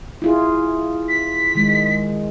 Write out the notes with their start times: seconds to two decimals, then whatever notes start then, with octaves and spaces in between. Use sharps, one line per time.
0.22 E4 F4 G#4
1.09 B6
1.55 D#3 G#3